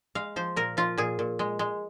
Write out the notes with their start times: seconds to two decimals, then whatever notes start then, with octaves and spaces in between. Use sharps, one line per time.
0.15 G#3 F5
0.36 F3 C5
0.56 A#2 A#4
0.77 F3 F4
0.98 A#2 G#4
1.19 A#2
1.39 G#3
1.59 G#3